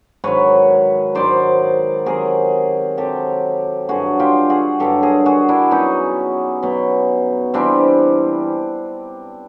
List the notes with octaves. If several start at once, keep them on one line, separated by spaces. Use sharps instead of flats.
G#2 D#3 F#3 B4 C#5
G#2 D#3 F#3 C5 D5
C3 D#3 F#3 G#4 A#4
C3 D#3 F#3 G4 A4
G2 D3 F#3 F#4 G#4
F4 G4
F#4 G#4
G2 D3 F#3 G4 A4
G#4 A#4
F#4 G#4
D4 E4
B2 F#3 C#4 D#4
B2 F#3
C3 E3 G3 C4 D4